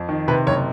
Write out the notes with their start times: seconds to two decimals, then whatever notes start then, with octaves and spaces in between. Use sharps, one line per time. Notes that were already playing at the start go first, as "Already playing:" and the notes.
Already playing: F2
0.09 D#3
0.28 C3 B4
0.47 F#1 C#5